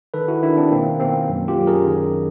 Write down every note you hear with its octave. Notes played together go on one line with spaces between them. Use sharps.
D#3 A4 B4
E4 F#4
D#3 D4 E4
C4 D4
B2 A#3 C4
B2 A#3 C4
F#2
F4 G4
F#2
G#4 A#4
D#3